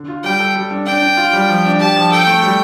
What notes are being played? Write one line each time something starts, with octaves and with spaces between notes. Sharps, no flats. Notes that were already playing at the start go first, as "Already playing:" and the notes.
Already playing: D3
F4
G3 G5
A4
G3
D4
D4 G5
D4
F4
G3
F3
D4
G4 A5
F3
A4 G5
A3
G3